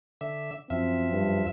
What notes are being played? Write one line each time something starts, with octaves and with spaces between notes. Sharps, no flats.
D3 E5
F#2 F3 C4 E5
G2